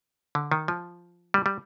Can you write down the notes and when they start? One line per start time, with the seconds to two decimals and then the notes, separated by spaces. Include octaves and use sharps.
0.35 D3
0.52 D#3
0.68 F3
1.34 G3
1.46 G3